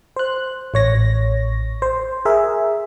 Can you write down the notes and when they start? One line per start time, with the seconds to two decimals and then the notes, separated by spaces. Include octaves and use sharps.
0.16 C5 F#6
0.74 A1 C#5 A#6
1.82 C5
2.25 G#4 A#4 E5